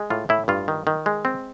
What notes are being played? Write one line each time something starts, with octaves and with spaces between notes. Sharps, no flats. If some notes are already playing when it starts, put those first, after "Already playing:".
Already playing: G#3
A2 F4
A2 E4
G2 F4
D#3
D#3
G#3
C4